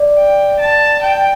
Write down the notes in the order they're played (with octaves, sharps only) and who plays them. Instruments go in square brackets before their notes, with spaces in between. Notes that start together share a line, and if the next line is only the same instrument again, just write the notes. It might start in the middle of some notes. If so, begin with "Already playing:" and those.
Already playing: [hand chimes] D5
[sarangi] G5
A5
G5